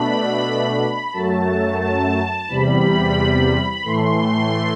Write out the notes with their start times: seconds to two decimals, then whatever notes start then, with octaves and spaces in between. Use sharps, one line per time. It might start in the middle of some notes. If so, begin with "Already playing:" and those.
Already playing: B2 A3 D4 B5
1.12 F#2 F#3 A3 A5
1.81 A5
2.48 E2 C3 G3 B5
3.84 A2 E3 A3 C6